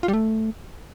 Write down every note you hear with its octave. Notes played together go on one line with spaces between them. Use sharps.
F4
G3
A3